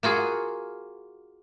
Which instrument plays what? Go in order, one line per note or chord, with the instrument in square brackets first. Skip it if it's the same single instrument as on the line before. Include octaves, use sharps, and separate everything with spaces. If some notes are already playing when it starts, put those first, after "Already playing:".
[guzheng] A#3 F4 F#4 G#4